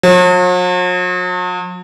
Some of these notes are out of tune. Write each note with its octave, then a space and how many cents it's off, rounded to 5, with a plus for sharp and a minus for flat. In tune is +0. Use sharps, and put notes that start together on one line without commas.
F#3 -45